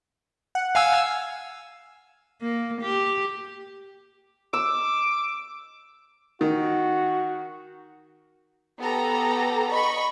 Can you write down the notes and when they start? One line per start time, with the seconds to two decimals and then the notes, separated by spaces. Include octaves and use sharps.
0.55 F#5
0.75 F5 G#5 E6
2.41 A#3
2.81 G4
4.53 D6 E6
6.41 D#3 F#4
8.79 B3 G4 A4 A#5
9.71 D#5 B5 C#6